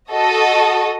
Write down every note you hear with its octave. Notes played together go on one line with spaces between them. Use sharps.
F#4 A4 D#5